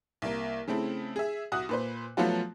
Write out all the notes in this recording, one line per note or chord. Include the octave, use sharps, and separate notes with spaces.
C2 A#3
C#3 A3 C4 E4
G#4 E5
C2 F#4 D#6 F#6
A#2 B4 C5
F3 F#3 A3 B3 F4 F#4